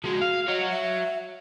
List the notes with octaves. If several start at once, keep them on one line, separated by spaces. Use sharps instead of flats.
F3 G#3 F#4
F5
F#4 C#5 D#5
E5